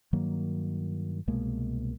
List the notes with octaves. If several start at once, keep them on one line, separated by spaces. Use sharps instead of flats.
G2 D#3 F#3 A#3
C2 B2 G#3 A#3